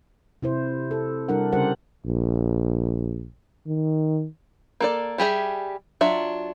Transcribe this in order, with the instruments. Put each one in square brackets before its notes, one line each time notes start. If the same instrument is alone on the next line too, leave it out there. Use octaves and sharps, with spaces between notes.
[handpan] C3 E4 C5
A4
C3 G3 D4 E4 A#4 F#5
C#3 G3 G4 A#4 C5 F#5
[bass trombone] A#1
D#3
[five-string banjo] A#3 A4 D5
G3 G4 G#4 E5
F#3 D4 F4 E5